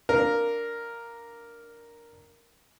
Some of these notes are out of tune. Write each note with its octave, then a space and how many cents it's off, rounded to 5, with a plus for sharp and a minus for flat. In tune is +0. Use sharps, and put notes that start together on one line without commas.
D4 +0 A#4 +0 F5 +0